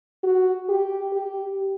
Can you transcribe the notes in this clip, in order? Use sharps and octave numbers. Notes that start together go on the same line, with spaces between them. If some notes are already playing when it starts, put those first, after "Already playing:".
F#4
G4
G4